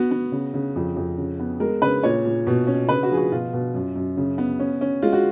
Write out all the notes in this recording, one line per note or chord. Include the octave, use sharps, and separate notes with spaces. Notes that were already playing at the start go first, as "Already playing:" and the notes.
Already playing: B3 F#4
B3
C#3
C#3
F2
F2
C#3
B3
G#3 A#4
C#3 B4
A#2 C#5
A#2
B2
C#4
C#3 B4
F#4
F3 G#4
F#4
B2 F4
B2
F#2
F#2
C#3
B3
C#4
C#4
G#3 F4
F#4